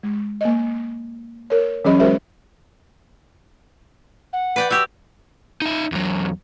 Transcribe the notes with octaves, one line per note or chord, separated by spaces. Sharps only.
G#3
A#3 D#5
A#4 C#5
E3 F#3 C#4 G#4 D#5 B5
G#3 F#4 G#4 A#4 C5 E5
F#5
B4 D5 G5
F#4 G4 E6
D#4 E5
E2 F#3